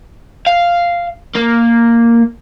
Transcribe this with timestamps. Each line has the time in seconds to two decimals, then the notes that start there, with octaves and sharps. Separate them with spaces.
0.47 F5
1.36 A#3